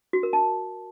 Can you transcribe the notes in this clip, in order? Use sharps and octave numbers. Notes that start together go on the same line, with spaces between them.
F#4
A#4
A5